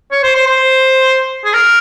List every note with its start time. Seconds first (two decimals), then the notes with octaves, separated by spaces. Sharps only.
0.11 C#5
0.23 C5
0.35 C5
0.47 C5
1.44 G#4
1.53 A#4